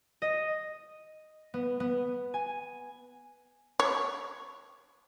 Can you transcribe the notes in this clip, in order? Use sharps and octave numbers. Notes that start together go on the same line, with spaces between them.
D#5
B3
B3
G#5
C#5